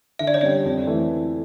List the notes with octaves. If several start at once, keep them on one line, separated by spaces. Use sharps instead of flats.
D3 E5
D5
C#5
G3 C#4 D5
F2
E3 A3